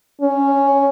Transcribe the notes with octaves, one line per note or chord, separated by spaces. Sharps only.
C#4